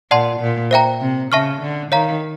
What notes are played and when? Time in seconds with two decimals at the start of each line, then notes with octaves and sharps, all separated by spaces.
0.11 A#2 D5 F#5 A5 C6
0.41 A#2
0.71 C5 E5 G5 A#5
1.01 C3
1.32 C#3 E5 A5 C#6 F6
1.62 D3
1.92 D#3 C#5 F5 A#5